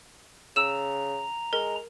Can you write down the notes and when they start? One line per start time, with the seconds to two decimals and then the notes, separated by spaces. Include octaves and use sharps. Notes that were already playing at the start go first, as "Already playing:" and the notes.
0.56 C#3 A#5 E6 E7
1.53 G#3 A#4